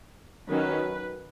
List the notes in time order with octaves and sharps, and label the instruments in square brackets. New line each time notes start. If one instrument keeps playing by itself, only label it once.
[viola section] D#3 F#3 C#4 B4